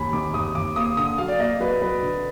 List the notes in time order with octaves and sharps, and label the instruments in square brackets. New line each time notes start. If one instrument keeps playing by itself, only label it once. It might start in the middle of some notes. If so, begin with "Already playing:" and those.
Already playing: [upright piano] D#2 [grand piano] G#5 B5
[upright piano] D#3 [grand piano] D6
[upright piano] D#2 [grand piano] D#6
[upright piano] D#2 [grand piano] D6
[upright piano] A#3 [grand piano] D#6
[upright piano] D3 [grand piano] D#6
[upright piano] F#3 [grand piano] F5
[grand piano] D5
[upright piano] A#3 [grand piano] D#5
[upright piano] F#3 [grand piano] B4
[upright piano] F#3 [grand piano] B4
[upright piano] D3